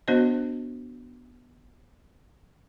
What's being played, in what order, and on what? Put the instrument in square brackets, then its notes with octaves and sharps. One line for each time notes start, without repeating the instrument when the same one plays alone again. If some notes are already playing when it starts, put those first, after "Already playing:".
[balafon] B3 D4 F#4 C5 D#5